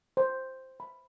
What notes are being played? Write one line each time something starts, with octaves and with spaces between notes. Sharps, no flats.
C5
B5